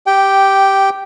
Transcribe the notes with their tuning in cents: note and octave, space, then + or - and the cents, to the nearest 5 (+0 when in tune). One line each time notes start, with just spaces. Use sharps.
G4 +0 G5 -10